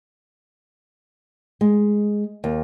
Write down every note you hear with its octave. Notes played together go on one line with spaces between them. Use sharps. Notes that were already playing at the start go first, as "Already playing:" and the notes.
G#3
D#2